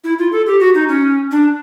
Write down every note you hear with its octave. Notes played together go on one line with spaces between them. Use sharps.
E4
F4
A4
G4
F#4
D#4
C#4
D4